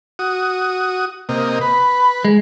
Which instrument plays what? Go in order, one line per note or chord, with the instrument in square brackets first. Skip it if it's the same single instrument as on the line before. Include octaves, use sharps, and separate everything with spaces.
[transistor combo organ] F#4 D#6
C3 A#3 D#5
[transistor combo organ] B4 [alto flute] B5
[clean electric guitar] G#3